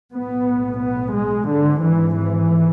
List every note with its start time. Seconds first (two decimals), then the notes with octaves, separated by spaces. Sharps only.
0.14 B1 A2 B3
0.82 B3
1.15 G#3
1.49 G#1 G#2 D3
1.83 E3
2.17 E3